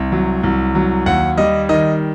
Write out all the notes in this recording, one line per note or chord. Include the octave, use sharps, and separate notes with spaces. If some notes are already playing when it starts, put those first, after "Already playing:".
Already playing: C2
F#3
C2
F#3
D#2 F#5
G3 D#5
D#3 D#5